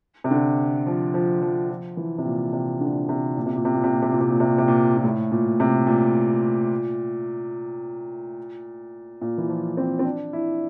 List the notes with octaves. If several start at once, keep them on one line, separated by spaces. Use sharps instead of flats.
C3
D3
F3
F3
F3
F3
E3
C3
A#2
C3
D3
C3
A#2
C3
A#2
C3
A#2
C3
A#2
C3
A#2
C3
A#2
C3
A#2
C3
A#2
A#2
A2
A#2
C3
A#2
A#2
E3
F3
C4
C4
D4
E4